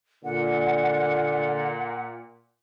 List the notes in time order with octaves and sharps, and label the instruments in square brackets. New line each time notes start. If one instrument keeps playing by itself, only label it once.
[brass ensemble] A#2 [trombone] D3 [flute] F#5